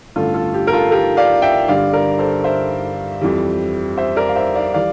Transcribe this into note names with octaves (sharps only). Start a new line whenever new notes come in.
A1 G2 D3 A3 F4 A4
F4 A4
G4
A#4
F4 A4
G4 A#4
D5 F5
E5 G5
G1 G2 D3 G3 D5 F5
A#4 D5
A4 C5
C5 E5
F2 E3 G3
C5 E5
A#4 D5
F5
C5 E5
D5 F5
E3 G3 D5 F5